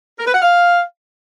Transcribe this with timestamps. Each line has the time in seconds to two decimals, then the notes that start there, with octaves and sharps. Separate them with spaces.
0.19 A#4
0.27 B4
0.35 F#5
0.42 F5